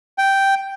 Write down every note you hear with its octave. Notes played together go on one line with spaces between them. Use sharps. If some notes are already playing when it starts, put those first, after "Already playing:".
G5